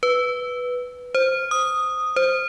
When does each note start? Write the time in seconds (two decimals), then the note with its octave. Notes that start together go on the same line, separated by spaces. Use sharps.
0.03 B4
1.15 C5
1.51 D#6
2.16 C5